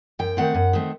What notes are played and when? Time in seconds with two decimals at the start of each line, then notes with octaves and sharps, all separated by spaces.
0.19 F#2 G5
0.37 D#3 A3 C4 F#5
0.54 F#2
0.73 D#3 A3 C4